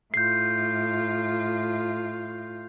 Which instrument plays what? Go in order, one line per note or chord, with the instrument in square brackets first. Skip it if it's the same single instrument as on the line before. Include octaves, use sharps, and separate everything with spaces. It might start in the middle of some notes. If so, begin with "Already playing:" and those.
[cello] A2 F4 [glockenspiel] G6 C7